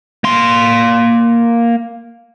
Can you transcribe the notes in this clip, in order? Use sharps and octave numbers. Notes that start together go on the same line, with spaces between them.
A#3 C6